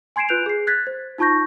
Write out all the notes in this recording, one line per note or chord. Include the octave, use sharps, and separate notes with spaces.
G#5 C6 G#6 C7 D7 E7
F4 B4 F#6 G6 D7 F7
G#4 C7
F#6 G#6 A6 B6
C5
D#4 F4 A5 C#6 G6 A#6